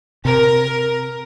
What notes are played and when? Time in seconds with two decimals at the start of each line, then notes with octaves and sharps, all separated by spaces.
0.25 C3 A#4